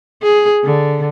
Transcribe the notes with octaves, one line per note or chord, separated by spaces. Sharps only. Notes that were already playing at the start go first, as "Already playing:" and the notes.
G#4
D3